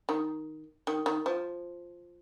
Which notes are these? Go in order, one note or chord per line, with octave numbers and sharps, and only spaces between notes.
D#3
D#3
D#3
F3